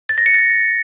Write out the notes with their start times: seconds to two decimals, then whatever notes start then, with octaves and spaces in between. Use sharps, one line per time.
0.09 A6
0.18 A#6
0.26 C#7
0.34 A6